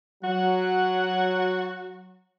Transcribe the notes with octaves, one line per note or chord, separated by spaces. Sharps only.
F#3 F#4 F#5